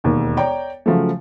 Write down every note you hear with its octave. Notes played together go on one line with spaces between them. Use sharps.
E1 D#2
C#5 D5 G5 A#5
C#3 F3 F#3 A3